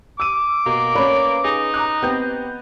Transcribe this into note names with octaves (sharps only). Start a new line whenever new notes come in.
D6 E6 D#7
B2 A#3
C#4 B4 C#5 D5 B5
D#4 G#4
A#5 D6 F#6
B3 C4 G4 G6